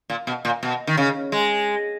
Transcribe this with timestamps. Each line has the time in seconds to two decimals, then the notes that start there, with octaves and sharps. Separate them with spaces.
0.10 A#2
0.27 B2
0.45 A#2
0.63 B2
0.87 D#3
0.97 C#3
1.32 G#3